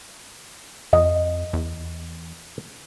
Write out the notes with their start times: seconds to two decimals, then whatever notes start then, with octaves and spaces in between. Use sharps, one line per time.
0.93 F2 D#5
1.53 E2